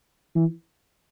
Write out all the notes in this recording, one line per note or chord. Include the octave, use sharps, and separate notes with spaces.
E3